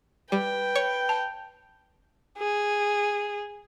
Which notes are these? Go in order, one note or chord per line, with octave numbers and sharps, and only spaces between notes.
G3 B4 G5
C#5 C#6
A5
G#4